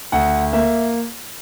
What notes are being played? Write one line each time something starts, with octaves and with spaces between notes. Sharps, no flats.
D2 F#5
A#3 E5